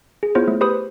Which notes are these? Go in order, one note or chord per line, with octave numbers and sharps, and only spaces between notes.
G#4
B3 E4 F4 G#4 C5 C#5
A3
G4 B4 C5 B5 D#6